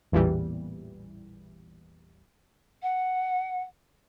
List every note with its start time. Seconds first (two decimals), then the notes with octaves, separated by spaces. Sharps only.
0.12 A1 E2 A#2 E3 G3
2.82 F#5